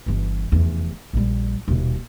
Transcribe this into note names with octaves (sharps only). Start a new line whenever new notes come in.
G1 E3
F1 E2
A#1 G3
D#1 B2